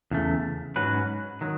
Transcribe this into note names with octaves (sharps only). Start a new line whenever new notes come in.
E2 C#3 A3
G#2 F#3 C#4 F#4 B4
D#3 F#3